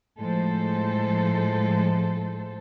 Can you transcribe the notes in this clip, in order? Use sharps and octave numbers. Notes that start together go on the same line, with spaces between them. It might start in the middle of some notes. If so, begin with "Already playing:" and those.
A2 F3 G#3 A4 C5